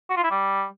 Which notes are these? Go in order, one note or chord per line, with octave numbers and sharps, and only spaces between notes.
F#4
F4
E4
G3